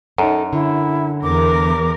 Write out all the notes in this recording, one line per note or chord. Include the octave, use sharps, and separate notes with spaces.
F#2 D#4 A4
D3 E4
E2 A#4 D6